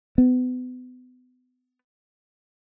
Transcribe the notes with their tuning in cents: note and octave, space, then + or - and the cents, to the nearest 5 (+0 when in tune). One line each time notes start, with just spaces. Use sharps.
B3 +35